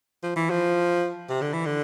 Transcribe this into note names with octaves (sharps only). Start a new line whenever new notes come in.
F3
E3
F3
C3
D3
E3
D3